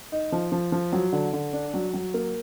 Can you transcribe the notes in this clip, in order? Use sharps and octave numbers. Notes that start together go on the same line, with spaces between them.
D#4
F3
F3
F3
F#3
D3
D3
D4
F#3
F#3
A#3